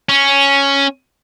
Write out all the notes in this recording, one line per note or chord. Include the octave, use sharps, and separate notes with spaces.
C#4